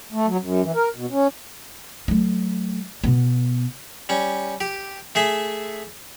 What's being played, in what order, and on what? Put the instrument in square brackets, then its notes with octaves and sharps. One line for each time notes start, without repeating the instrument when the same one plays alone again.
[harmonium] A3
F#3
F#2
E3
A#4
B2
C#4
[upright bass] F#3 A3
B2 B3
[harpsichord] G3 C#4
G4
A3 G#4 E5